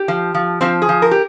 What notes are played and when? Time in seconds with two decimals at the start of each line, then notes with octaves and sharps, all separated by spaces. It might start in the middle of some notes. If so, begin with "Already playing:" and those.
Already playing: G4
0.08 F3
0.34 F3
0.61 F3 C4
0.82 G#4
0.89 F3
1.02 A#4
1.11 G4